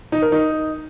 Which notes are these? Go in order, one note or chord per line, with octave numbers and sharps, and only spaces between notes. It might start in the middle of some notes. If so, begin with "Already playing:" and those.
D#4
A#4
D#4